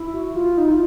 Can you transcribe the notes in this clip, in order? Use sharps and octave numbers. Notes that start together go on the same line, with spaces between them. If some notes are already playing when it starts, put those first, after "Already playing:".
Already playing: E4
F#4
F4
D#4
F4